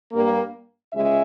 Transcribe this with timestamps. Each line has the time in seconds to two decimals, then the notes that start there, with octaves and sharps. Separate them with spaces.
0.12 G2 G3 A#3
0.93 C#2 C#3 G#3 E5